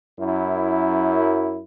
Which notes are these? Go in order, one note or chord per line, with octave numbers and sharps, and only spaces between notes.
F#2 E4